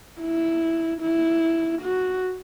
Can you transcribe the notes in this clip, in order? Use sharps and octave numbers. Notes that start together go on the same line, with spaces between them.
E4
E4
F#4